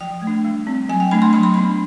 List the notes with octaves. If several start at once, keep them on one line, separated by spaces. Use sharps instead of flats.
F3 G5
A3
D4
G3
C4
F#3 G#5
G5
A3 D4 B5
C6
F#3 B5
C6
B3 D4 B5